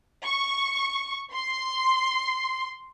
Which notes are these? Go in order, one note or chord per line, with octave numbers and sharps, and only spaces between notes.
C#6
C6